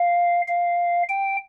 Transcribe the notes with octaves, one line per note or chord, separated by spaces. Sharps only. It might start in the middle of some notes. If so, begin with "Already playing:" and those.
Already playing: F5
F5
G5